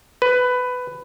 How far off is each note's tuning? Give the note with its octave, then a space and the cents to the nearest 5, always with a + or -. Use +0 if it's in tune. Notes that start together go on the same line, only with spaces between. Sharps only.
B4 +15